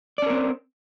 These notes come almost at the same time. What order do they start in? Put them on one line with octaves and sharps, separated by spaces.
D5 C#4 A#4 C4